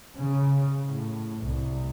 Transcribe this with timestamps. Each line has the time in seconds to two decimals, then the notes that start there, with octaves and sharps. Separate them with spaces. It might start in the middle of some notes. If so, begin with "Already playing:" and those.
0.18 C#3
0.86 A2
1.41 C2